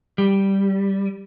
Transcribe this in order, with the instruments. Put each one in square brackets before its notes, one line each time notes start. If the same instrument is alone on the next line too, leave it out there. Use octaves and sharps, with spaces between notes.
[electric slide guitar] G3